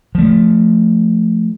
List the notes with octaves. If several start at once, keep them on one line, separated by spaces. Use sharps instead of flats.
F3 A3